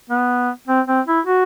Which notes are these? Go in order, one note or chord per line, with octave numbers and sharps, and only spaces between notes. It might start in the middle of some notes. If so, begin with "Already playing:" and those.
B3
C4
C4
E4
F#4